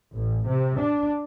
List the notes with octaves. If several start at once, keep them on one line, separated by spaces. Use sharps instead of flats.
A1
C3
D4